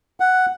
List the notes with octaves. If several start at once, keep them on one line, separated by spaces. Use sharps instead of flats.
F#5